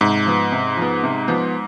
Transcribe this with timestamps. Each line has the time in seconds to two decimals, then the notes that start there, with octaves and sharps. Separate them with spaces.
0.01 G#2 C3
0.26 F3 B3
0.52 C3
0.77 F3 B3
1.03 C3
1.28 F3 B3